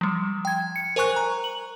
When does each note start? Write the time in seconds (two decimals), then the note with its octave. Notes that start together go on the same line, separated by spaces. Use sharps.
0.01 F3 G3
0.45 G5 G#6
0.76 C#7
0.96 A#4 C5 G#5 C#6 F#6
1.16 A#5
1.44 F#7